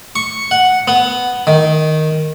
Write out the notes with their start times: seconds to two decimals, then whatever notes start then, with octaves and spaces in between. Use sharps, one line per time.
0.16 C#6
0.51 F#5
0.88 B3
1.47 D#3